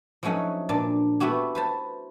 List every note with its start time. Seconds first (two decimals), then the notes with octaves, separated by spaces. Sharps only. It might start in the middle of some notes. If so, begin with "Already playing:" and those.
0.23 F3 F#3 A3 C#4 D#4 F#5
0.69 A#2 D4 A5
1.20 A3 B3 E4 F#4 G4
1.55 B4 C5 A5